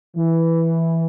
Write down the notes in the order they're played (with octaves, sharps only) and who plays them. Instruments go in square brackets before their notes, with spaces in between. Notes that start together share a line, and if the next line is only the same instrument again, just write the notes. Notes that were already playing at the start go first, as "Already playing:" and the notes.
[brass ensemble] E3